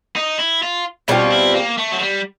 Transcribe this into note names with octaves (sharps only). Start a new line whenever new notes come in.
D#4
E4
F4
B2 G3 C4 C#4 F4
E4
A#3
A3
F#3
G3